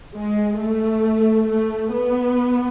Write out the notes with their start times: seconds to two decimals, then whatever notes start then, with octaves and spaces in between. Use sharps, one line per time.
0.15 G#3
0.59 A3
1.49 A3
1.93 B3